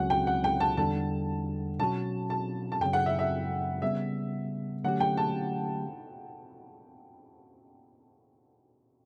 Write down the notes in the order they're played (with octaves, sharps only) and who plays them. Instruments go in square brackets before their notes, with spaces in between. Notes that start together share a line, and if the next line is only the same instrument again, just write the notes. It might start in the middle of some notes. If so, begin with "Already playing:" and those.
Already playing: [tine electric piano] C#2 C#3 F#3 C#4 F#4 [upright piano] F#5
[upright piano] G5
F#5
G5
A5
[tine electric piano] E2 D3 G3 D4 A4 [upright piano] A5
[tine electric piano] B2 F#3 C#4 F#4 [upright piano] A5
[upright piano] A5
A5
[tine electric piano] F#2 C#3 F#3 [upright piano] G5
[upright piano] F#5
E5
E5
[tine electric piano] C#3 G3 B3 [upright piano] E5
[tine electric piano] D3 F#3 A3 C#4 G4 [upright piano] F#5
[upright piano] G5
A5